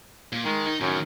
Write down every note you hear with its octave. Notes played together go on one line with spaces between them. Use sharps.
A#2
D#3 G#3
D#4
F#2 A2 D#3